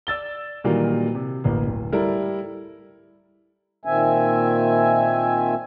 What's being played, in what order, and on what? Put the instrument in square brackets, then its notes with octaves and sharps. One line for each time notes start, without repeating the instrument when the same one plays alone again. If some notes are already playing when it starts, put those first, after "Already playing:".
[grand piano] D5 E6 A6 G7
A#2 D#3 E3 F#3 G3 A#3
C3
A1 D2 A#3
D1
G3 E4 A4 A#4
[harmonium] A#2 D#3 C4 E5 G#5